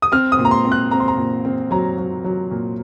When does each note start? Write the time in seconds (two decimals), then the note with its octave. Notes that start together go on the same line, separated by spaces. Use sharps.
0.02 D#6
0.12 C4 F6
0.32 D#6
0.39 A#2
0.45 A#5
0.51 C6
0.65 C4
0.72 F#6
0.91 C4 A#5
1.00 C6
1.08 A#5
1.18 A#2
1.45 C4
1.71 F#3 A#5
1.98 F#3
2.24 F#3
2.51 A#2